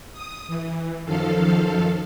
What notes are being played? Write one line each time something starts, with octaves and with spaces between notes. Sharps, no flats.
D#6
E3
F#2 D#3 F3 A4 F5